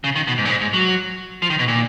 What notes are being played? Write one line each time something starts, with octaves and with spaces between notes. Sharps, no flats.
C#3
D#3
B2
G#2
A#2
G#2
G#2
F#3
F3
D#3
B2
A#2